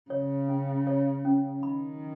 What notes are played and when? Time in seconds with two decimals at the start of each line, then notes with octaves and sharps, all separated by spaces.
0.10 C#3 C#5
0.49 C#4
0.87 C#5
1.25 C#4
1.62 D#3 B5